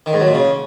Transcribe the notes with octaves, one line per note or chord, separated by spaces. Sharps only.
D#3
G#2
F#3
A#2
C#3